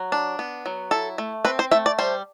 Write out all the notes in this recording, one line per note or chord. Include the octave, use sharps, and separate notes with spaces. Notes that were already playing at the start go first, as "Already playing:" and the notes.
Already playing: F#3
D4
B3
F#3
E4 A4
A3
C4 B4
C5
A3 E5
D5
G3 C5